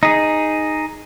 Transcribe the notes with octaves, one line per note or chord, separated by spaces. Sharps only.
D#4 G#4